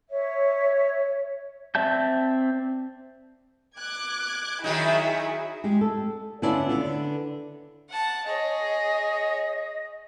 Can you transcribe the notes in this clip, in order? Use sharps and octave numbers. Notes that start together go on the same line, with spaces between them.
C#5 E5
C4 D5 E5 A5 G6
D6 F#6 G#6
D#3 F#3 D#4 E4 G#4 E5
G#3 G4
A4
D3 B3 C#4 D4 E4 F4
D3 B3
F#5 A5
G#4 C#5 D#5